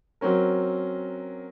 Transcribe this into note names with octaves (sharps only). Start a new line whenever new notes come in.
F#3 C4 C#4 A#4